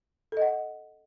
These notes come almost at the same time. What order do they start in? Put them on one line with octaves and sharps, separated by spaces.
A4 D#5 F#5